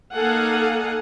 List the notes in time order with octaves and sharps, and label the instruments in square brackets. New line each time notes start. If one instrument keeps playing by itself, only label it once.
[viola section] A#3 D#4 A4 F5 F#5 G#5